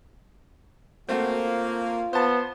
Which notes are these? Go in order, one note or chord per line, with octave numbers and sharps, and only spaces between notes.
A3 A#3 C4 F#4
F4
B3 C5 A5